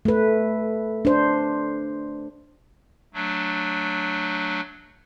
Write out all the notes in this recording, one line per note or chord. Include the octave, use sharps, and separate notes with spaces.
A3 B4
D4 C5
F#3 A3 D4